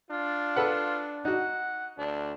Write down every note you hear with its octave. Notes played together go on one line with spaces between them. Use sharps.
D4 F4
A4 B4 F#5
D#4 F#4 F#5
D2 D4